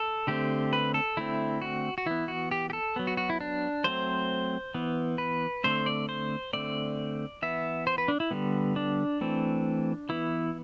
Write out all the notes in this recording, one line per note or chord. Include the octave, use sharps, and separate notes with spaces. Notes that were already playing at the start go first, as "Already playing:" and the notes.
Already playing: A4
D3 A3 C4 G4
B4
A4
D3 A3 C4 E4
F#4
F#4
E3 B3 E4
F#4
G4
G4
A4
F#3 B3
F#4
F#4
E4
D4
F#3 A3 C4 C5
E3 B3
B4
D3 A3 C4 C5
D5
C5
D3 A3 C4 D5
E3 B3 E5
C5
B4
D4
E4
D3 G3 B3
D4
E3 A3 C4
E3 B3 E4